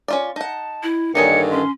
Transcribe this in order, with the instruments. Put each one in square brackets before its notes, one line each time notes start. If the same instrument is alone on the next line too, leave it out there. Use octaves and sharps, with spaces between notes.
[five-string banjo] C#4 F4 D5
[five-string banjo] D#4 F#5 [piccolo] A5
[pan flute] E4
[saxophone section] G2 D3 D#3 [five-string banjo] A#3 D#4 G#4 [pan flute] C#5 [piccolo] C#7
[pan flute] C#4 [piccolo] C6